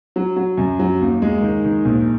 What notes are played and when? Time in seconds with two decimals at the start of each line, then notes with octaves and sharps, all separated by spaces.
0.16 F#3
0.36 F#3
0.58 F#2
0.79 F#3
1.01 D#2
1.22 G#3
1.42 D#3
1.64 D#3
1.85 A#1